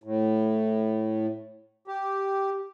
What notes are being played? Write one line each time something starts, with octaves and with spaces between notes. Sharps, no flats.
A2
G4